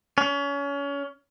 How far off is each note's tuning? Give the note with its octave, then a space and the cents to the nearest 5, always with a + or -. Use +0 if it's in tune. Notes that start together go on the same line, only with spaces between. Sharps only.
C#4 +30